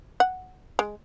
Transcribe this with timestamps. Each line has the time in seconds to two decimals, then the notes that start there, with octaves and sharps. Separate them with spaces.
0.20 F#5
0.79 G#3